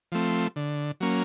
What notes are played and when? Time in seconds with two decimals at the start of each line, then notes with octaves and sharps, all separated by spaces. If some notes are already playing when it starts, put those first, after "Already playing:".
0.12 F3 A3 C4
0.56 D3
1.00 F#3 A#3 C#4